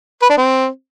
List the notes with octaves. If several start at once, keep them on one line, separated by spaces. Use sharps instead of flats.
B4
D4
C4